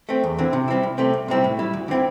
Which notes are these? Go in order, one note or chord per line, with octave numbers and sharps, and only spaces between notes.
A3 C4
E2
D3 C4 E4
C3
G3 C4 E4
C2
C3 A3 C4
C2
C3 G3 C4 E4
A2
G3 E4
D2
D3 C4 E4